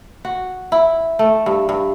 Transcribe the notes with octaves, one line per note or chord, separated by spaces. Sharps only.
F#4
E4
A3
G2
G2